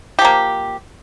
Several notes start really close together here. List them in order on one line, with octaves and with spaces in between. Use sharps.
G4 F3 A#3